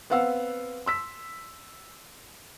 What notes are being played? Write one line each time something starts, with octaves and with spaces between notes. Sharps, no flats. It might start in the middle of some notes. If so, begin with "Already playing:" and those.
B3 C4 F5 F#5 E6
C6 E6 B6